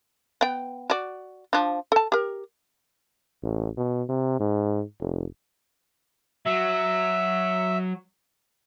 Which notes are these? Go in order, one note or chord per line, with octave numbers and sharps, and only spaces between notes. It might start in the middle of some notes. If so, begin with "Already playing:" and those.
B3 G5
F#4 D5
F3 D4
A4 A5
G4 A#4
A1
B2
C3
G#2
F1
F#3 E5